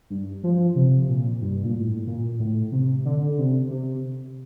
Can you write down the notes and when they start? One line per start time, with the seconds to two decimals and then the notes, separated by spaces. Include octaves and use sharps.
0.10 G2
0.43 F3
0.76 C3
1.08 A#2
1.41 G2
1.65 A#2
1.74 A2
2.07 A#2
2.39 A2
2.72 C3
3.05 D3
3.38 C3
3.70 C3